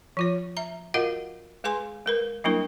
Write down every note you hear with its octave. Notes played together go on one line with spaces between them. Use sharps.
F3 F4 C#5
E5 A#5
F4 F#4 A#4 D#5 F5 F#5
G#3 G#4 B4 G#5 C6
G#3 A#4 B4
F#3 G3 A#3 D4 E4 A#4